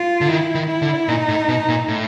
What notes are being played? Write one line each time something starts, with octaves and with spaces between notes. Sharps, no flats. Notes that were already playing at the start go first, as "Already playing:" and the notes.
Already playing: F4
D3
D#3 E4
D#3
E4
D3
A#2 D#4
A2
B2
A#2
A2